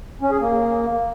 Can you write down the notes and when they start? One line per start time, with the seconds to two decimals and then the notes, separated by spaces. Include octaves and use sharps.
0.22 C#4
0.31 G#4
0.41 A#3